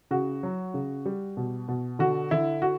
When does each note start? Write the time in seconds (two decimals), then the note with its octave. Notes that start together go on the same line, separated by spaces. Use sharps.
0.11 C#3 F#4
0.43 F#3
0.74 C#3
1.05 G3
1.37 B2
1.68 B2
1.99 D3 F#4
2.31 D3 E4
2.62 F#4